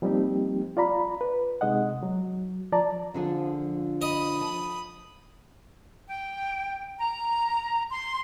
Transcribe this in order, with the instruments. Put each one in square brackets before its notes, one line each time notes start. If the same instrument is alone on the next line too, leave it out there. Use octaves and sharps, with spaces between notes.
[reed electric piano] F3 G3 A#3 C4 D#4 G4
F4 D5 A#5 B5
B4
C3 G#3 D#4 D#5 F#5
F#3
F3 D5 A5 A#5
[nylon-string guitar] D3 D4 G#4 [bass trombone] F3
[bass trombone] F3
[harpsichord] D#5 [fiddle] B5 D#6
[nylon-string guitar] A5
[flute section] G5
A#5
C6